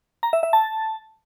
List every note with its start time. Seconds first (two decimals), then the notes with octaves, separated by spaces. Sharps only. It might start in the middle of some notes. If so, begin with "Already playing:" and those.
0.23 A#5
0.33 E5
0.43 E5
0.53 A5